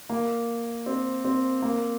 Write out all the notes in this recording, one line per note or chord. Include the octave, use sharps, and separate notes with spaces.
A#3
C4
C4
A#3